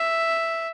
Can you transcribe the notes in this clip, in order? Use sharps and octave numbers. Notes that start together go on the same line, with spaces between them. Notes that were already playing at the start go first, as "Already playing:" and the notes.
Already playing: E5